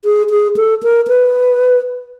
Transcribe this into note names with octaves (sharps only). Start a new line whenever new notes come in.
G#4
G#4
A4
A#4
B4